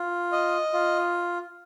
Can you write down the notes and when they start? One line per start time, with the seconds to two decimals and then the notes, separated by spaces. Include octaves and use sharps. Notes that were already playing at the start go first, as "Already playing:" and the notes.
Already playing: F4
0.32 D#5
0.73 F4